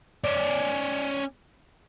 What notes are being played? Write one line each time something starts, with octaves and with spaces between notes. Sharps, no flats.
C#4 D5